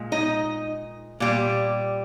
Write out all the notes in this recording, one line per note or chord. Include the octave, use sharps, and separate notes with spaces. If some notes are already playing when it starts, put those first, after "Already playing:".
Already playing: A#2 G#3
D#4 D#5
A#2 G3